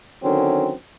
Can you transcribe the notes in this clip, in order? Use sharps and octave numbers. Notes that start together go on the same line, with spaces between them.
D3 D#3 F#3 C4 C#4